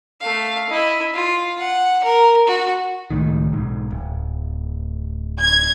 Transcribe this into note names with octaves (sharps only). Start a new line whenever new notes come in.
A3 F5
E4 D#5
F4
F#5
A#4
F#4
C#2 A2 D#3
B1 G#2
D1
G#6